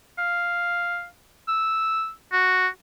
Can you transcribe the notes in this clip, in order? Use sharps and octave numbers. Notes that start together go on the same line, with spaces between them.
F5
E6
F#4